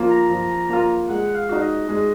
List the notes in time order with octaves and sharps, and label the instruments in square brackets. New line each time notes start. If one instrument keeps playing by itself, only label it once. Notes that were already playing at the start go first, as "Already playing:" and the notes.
Already playing: [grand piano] F3 A#3 F4
[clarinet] A#5
[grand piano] F3
A#3 F4
[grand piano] G#3 [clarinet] F#5
[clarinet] F5
[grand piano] D#4 F#4
[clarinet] D#5
[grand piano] G#3